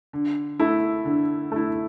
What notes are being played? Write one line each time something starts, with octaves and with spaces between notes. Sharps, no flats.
D3
A3 E4
D3
A3 E4